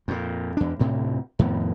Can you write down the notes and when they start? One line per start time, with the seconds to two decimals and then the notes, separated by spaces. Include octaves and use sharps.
0.08 F2 A#2
0.57 E2 D4
0.79 D2 A2 C3
1.39 F2 A2 D#3 B3